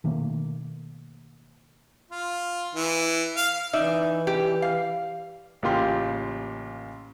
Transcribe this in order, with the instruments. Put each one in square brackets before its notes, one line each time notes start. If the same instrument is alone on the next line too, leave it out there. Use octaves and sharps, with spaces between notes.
[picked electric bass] B2 D#3 A3 A#3
[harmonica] F4
E3
F5
[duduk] E3 [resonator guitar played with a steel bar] D#4 D5 E5
[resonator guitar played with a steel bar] G4
F5
[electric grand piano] A1 C#3 A#3 F4 G4 C6